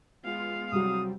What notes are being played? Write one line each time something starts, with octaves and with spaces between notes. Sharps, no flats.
G#3 B3 F4 F5
C2 F#3 G3 C4 D#6